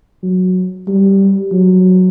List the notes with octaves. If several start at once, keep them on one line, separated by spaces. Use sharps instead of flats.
F#3
G3
F#3